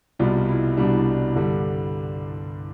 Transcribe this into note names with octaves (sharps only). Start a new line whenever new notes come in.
C2 B2 G3 F4
E4
C2 B2 G3 D4
G2 D3 G3